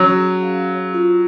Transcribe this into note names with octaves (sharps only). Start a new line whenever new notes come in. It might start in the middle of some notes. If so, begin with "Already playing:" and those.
Already playing: F#3 C#4
G#4
F5
C#5
F4